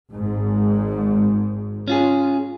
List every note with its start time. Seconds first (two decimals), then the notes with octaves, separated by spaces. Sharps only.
0.12 G#1 G#2
1.88 C#4 F4 G#4